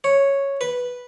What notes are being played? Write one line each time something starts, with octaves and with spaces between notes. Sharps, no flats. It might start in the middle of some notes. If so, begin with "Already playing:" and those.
C#5
B4